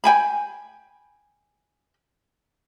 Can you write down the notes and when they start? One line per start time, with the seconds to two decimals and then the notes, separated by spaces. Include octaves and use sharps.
0.04 G5 G#5 B5